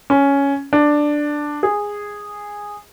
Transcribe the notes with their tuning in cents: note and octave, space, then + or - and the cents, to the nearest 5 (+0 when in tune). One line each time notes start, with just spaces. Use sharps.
C#4 +5
D4 +5
G#4 -10